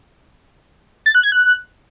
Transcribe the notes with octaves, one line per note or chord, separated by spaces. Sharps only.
A6
F#6
G#6
F#6